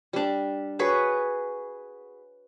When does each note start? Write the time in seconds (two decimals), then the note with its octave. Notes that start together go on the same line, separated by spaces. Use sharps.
0.13 G3 D4
0.79 F#4 G#4 B4 C#5